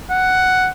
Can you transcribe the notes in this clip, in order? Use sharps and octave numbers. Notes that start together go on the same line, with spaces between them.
F#5